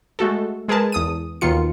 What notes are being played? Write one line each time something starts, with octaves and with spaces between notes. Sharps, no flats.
G#3 A3 F#4 A4
G#3 G#4 A#4 B4 A5
E2 D#6 D#7
D#2 B2 D#3 F4 C#7